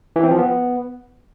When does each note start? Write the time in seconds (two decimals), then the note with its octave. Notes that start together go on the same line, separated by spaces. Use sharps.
0.16 E3
0.23 C4
0.31 F3
0.38 B3